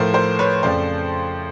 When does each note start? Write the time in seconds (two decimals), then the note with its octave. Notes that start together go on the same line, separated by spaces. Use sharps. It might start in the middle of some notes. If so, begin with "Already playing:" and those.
Already playing: A2 F3 A3 A#4 C5
0.14 A#4 C5
0.39 B4 C#5
0.63 F2 C#3 F3 A3 C5 D5